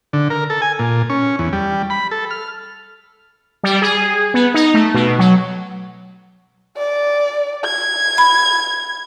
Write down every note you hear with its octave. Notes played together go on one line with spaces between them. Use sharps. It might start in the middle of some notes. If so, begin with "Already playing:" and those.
D3
A#4
A4
G#5
A#2
C#4
E2
G3
B5
A4
F6
G3
G#4
B3
D#4
A3
B2
F#3
D5
G#6
B5